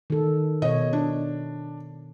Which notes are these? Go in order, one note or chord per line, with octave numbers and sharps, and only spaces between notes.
D#3 A4
B2 C#5 D#5
D4